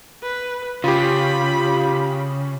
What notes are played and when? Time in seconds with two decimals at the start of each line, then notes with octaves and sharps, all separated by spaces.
0.22 B4
0.84 C#3 F4 G4 B5